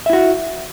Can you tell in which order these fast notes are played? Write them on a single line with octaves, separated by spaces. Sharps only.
E5 E4 F#4